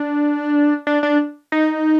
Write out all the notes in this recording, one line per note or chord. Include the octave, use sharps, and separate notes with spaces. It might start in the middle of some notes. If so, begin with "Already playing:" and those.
Already playing: D4
D4
D4
D#4